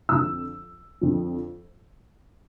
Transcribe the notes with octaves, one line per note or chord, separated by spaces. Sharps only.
F2 D3 F3 E6
F2 D3 F3